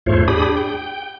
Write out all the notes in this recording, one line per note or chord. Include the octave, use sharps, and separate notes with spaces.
E2 G#2 A3 F4 C5 C#5
D4 G4 G#4 B5 D#6
G5